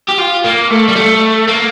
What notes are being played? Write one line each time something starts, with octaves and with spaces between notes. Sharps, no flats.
G4
F4
A#3
A3
G3
A3
A#3